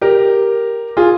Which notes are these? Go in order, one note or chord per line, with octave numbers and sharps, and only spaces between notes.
G4 A#4
F4 G#4